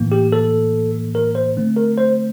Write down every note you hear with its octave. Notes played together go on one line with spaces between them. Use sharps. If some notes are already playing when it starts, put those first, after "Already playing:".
Already playing: A2 E3 A#3
G4
A4
A#4
C5
D3 A3 C4
A#4
C5